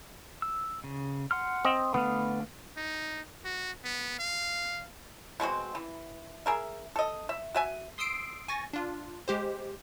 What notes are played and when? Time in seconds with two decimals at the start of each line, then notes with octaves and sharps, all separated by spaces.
0.42 E6
0.84 C#3
1.31 F#5 C6 F6
1.65 C4 D#5
1.94 D3 A3 B3 F5
2.77 D#4
3.45 F#4
3.84 B3
4.19 F5
5.40 B2 G#3 C4 F#4
5.75 E3
6.46 G#4 A#4 E5
6.96 A4 D#5
7.29 E5
7.54 F#4 E5 G#5
7.98 C6 D#6 E6 C7 D7
8.48 G#5 C#6 A6 A#6
8.73 D4 F4
9.28 G#3 G4 C5